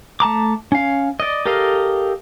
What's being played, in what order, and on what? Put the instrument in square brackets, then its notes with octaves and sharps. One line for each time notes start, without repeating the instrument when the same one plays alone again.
[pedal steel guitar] A3 A5 A#5 D6
C#4 F5
D5 D#5
G4 A4 A#4 D#5 F5